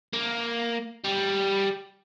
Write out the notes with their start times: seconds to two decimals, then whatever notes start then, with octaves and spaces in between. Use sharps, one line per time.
0.13 A#3
1.04 G3